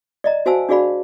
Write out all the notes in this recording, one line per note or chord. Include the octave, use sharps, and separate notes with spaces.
D5 D#5 A#5
F#4 C5 F5 G#5 A5 E6
D4 F#4 G#4 D5 F5 B5